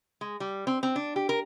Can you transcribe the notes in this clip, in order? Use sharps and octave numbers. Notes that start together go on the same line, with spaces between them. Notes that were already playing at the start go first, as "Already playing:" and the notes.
G#3
G3
C4
C4
D4
G4
A#4